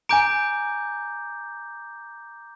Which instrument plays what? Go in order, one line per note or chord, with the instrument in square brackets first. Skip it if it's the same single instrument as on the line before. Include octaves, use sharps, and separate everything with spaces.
[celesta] G#5 D7 [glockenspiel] A#5 D6 G6